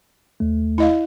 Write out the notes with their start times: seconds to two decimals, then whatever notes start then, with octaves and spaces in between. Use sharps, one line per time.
0.40 D#2 A3
0.78 E4 D#5 F5